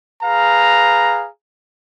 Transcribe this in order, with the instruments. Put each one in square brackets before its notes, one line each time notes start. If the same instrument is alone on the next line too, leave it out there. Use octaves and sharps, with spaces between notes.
[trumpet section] G#4 B4 F5 A#5